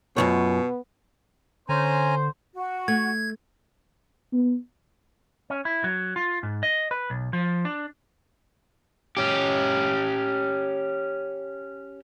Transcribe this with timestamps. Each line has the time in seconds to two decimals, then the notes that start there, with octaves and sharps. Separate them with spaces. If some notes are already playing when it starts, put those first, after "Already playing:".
0.17 F#2 B2 B3 F4 C#5
1.69 D3 C#4 C5 G#5 A#5
2.54 F#4
2.88 A3 G#6
4.33 B3
5.50 C#4
5.65 E4
5.84 F#3
6.16 F4
6.43 G#2
6.63 D#5
6.91 B4
7.10 B1
7.33 F3
7.65 D4
9.17 C#4 G4